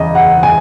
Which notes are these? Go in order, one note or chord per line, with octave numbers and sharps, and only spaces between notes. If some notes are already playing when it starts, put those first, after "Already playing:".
Already playing: E2 C#3 D#5
F#5
G#5